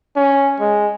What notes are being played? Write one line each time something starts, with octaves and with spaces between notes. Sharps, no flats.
C#4
G#3